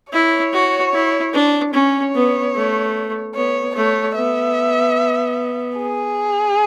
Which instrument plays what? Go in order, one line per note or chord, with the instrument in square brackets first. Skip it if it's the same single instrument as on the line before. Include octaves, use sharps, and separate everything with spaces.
[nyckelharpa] E4 [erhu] C#5
[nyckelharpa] F#4
E4
D4
[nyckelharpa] C#4 [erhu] C#5
[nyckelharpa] B3
A3
[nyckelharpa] B3 [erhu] C#5
[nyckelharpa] A3 [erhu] C#5
[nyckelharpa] B3 [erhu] E5
[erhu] G#4